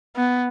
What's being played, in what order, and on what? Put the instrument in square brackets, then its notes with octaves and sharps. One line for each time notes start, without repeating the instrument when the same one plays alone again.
[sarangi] B3